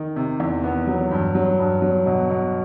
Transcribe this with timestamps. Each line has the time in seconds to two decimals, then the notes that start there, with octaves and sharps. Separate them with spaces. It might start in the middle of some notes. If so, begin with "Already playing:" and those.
Already playing: D#3
0.16 C3
0.40 E2
0.64 B3
0.87 F#3
1.11 G2
1.35 F#3
1.59 G2
1.82 F#3
2.06 B2
2.30 B2